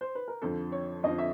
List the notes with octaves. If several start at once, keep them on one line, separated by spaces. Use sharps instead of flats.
C5
B4
A#4
F2 D3 F3 A4
C#5
F2 D3 F3 D#5
E5